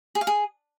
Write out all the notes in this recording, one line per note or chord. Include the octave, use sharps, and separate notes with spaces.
G#4
F5
G#4